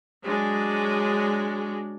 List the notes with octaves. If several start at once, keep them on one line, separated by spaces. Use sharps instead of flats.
F#3 G#3 D4